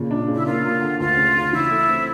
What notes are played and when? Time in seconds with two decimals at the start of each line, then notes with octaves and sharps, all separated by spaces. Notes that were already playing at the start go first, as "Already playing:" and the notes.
Already playing: A#2 C#3
0.11 D4
0.28 C#3
0.34 E4
0.46 A#3 F4
0.64 A#3
0.81 D3
1.00 D2 F4
1.17 C#3
1.35 C#3
1.53 E3 E4
1.70 A3
1.89 C4